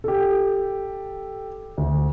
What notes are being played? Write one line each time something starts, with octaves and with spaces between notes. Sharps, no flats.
G4 A4
D2